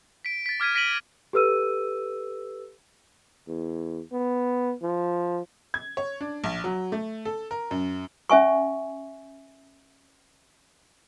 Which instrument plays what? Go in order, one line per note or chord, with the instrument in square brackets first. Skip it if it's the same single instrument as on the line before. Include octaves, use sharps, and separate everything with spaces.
[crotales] B6 D7
A6 B6
D6 F6 G#6 B6 D#7
A#6 B6 D7 D#7 F#7
[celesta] G4 A4 B4 E6 D#7
[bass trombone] E2
B3
F3
[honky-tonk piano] G#6
C#5
D4
A#1
F#3
A3
A4
A#4
F#2
[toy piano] C#4 E5 G#5 C#6